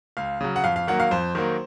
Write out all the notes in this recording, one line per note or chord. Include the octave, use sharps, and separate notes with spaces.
C#2 F5
C#3 F#3
F#5
F2 F5
F5
D#3 F#3 A#3 F#5
F5
F2 C5
D#3 F#3 A#3